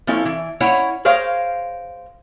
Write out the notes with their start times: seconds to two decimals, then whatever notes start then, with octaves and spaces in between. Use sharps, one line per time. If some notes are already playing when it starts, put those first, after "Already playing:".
0.07 F3 C4 C#4 E4 A4
0.25 E3
0.60 C#4 E4 C#5 F#5 A#5
1.05 G#4 A#4 C5 C#5 F5